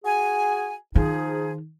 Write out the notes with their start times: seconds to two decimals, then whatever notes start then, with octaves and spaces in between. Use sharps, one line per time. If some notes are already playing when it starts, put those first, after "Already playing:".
0.05 F#4 G#4 G#5
0.95 D#3 F3 D#4 G#4